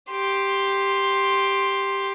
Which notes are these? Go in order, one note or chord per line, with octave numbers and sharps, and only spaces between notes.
G4 C6